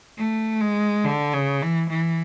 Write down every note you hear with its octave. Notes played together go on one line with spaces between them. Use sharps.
A3
G#3
D3
C#3
E3
E3